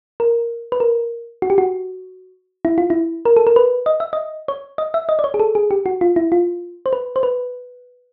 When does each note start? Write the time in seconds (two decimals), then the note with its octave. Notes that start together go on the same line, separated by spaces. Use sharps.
0.20 A#4
0.72 B4
0.80 A#4
1.42 F#4
1.50 G4
1.58 F#4
2.65 E4
2.78 F4
2.90 E4
3.25 A#4
3.37 A4
3.47 A#4
3.56 B4
3.86 D#5
4.00 E5
4.13 D#5
4.48 C#5
4.78 D#5
4.94 E5
5.09 D#5
5.19 D5
5.24 C#5
5.34 G#4
5.40 A4
5.55 G#4
5.71 G4
5.86 F#4
6.01 F4
6.16 E4
6.32 F4
6.86 C5
6.93 B4
7.16 C5
7.23 B4